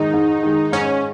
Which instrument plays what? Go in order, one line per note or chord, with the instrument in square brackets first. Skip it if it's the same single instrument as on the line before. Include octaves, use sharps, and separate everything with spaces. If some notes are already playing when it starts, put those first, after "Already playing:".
Already playing: [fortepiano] G#2 D#3 G#3 [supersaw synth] D#4
[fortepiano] G#2
D#3 G#3
[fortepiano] G#2 [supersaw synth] C#4